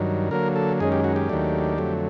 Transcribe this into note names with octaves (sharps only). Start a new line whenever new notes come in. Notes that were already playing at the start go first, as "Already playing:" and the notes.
Already playing: G2 D#3 F#3
D3 F#3 A#3 A#4
A4
F#2 D#3 G#3 C#4 G#4
G4
F#4
G4
D#2 D#3 F#3 A3 D4
F2 D3 F#3 A3